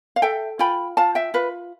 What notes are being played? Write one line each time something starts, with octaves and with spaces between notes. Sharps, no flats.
F5
A4 E5 G5
F4 G5 B5
F4 F5 A5
E5 G5
F4 B4